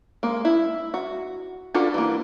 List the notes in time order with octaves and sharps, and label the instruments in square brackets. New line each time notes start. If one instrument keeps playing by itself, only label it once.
[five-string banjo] G#3 A#3
E4
F#4
D4 F4 F#4 A4 B4
E3 A#3